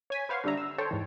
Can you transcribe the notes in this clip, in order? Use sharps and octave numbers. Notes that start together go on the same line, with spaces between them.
C#5 G#5 B6
B4 C5 F5 F#5 C6 C#6
D3 G3 D4 E5 A#5
E6
A4 C5 C#5 G5 A5
G#2 E3